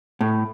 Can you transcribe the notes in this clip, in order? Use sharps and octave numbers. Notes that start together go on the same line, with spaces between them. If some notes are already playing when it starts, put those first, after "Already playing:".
A2